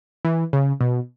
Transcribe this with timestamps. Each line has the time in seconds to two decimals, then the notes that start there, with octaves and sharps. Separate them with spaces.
0.25 E3
0.53 C#3
0.81 B2